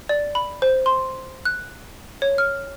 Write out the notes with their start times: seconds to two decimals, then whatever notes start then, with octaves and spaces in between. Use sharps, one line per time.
0.09 D5
0.35 B5
0.62 C5
0.86 C6
1.45 F#6
2.22 C#5
2.38 F6